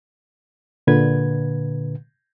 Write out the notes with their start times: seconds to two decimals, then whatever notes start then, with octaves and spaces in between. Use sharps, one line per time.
0.87 A#2 D3 B4 G#6